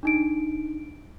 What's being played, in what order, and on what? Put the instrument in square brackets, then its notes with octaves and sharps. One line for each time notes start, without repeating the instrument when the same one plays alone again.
[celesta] D4 D#4 D7